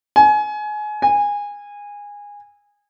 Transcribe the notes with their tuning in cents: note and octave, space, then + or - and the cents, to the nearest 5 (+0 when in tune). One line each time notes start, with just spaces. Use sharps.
G#5 +25
G#5 -20